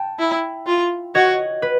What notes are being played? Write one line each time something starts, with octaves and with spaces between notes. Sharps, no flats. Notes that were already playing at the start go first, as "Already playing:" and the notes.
Already playing: G5 A5
E4
F4
F#4 C#5 D#5
B4